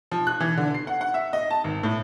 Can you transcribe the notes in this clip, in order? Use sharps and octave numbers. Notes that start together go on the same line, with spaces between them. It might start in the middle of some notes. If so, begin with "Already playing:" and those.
F3
F#6
E3
D3
C7
F#5
F#5
E5
D#5
A5
G#1
A2